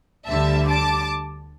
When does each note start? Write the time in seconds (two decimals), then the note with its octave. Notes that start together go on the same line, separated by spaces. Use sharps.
0.27 D2 D3 G3 E5 A5
0.67 A5 D6